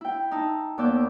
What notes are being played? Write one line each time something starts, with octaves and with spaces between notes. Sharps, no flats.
E4 G5
D#4 A5 E6
D#2 B3 D5 D6 E6 G6